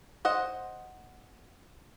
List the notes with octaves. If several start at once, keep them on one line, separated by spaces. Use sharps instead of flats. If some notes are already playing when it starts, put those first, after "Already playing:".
C5 D#5 F#5